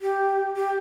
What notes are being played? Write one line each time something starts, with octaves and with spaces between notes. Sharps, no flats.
G4
G4